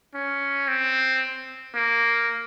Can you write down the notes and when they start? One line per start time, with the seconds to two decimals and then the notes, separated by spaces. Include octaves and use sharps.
0.14 C#4
0.68 C4
1.75 A#3